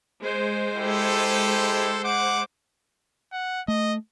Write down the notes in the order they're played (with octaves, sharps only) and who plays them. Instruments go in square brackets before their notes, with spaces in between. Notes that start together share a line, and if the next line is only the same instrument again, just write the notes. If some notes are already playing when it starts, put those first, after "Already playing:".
[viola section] G#3 C5
[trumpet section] E4 G4 A4
F#5 D6
[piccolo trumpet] F#5
[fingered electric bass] A3 [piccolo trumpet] D#5